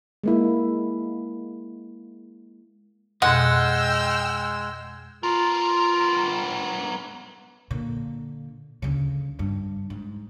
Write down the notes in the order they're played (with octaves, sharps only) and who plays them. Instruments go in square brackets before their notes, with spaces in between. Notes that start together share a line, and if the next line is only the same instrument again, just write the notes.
[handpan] G#3 A#3 E4
[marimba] F2 B2 [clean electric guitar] G#3 [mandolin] F#5 [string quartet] G5 E6 F6
[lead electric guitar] B3 A#4 [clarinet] F4
[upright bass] A#2 D3
D2 C#3
G2
G#2